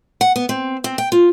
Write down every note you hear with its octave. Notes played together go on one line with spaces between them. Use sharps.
F#5
B3
C4
C4
G5
F4